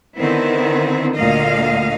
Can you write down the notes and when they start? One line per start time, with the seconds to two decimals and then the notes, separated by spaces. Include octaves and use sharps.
0.18 D3 D#3 B3 C4 E4
1.15 D2 A#2 D3 D#5 F5